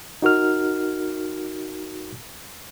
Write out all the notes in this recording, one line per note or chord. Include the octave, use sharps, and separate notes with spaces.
D#4 F#4 A#4 F6